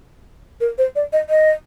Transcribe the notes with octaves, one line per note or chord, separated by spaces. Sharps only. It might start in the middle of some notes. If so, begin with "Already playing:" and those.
A#4
C5
D5
D#5
D#5